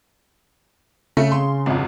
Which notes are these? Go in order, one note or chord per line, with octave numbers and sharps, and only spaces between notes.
C#3 A3
C6
G#1 F2